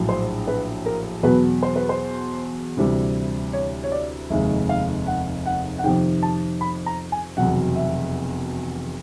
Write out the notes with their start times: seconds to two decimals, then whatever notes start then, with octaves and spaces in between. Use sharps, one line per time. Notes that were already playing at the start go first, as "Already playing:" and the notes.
Already playing: A#1 A2 F#3
0.09 C5
0.47 B4
0.86 A#4
1.23 E2 B2 F#3 B4
1.63 C5
1.76 B4
1.89 C5
2.77 D2 C3 E3 G3
3.53 C#5
3.84 C#5
3.92 D5
4.30 F1 D#2 D#3 G#3 E5
4.69 F5
5.07 F#5
5.46 F#5
5.78 F#5
5.84 F2 C3 D#3 G5
6.23 A5
6.61 B5
6.86 A#5
7.12 G#5
7.37 F1 E2 B2 F#3 F#5
7.75 E5